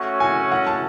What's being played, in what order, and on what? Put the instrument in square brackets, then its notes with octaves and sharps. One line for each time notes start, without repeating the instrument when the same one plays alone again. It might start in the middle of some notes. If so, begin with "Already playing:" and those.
Already playing: [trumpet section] A3 C#4 F#4 C#5
[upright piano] G#5
F#5
A5